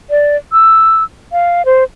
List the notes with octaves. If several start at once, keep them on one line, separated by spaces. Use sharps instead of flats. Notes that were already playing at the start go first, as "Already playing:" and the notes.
D5
E6
F5
C5